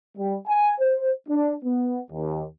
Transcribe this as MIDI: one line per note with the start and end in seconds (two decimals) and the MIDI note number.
0.18 0.36 55
0.48 0.74 80
0.81 1.10 72
1.29 1.54 62
1.65 2.00 59
2.11 2.43 39